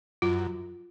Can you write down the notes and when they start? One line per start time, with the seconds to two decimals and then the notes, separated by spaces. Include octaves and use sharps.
0.22 F#2 F4